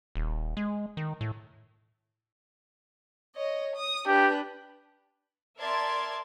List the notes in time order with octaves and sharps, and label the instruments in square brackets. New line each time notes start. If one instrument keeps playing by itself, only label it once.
[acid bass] D#1
G#3
D#3
A2
[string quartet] C#5 D#5
D#6
[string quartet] D4 B4 [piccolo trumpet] G4
[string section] A#4 D5 E5 A5 C6 G#6